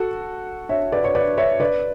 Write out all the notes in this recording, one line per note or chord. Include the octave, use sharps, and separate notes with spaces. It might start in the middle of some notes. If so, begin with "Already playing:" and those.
Already playing: F#4 A4
C#5 E5
B4 D5
C#5
B4 D5
C#5 E5
B4 D5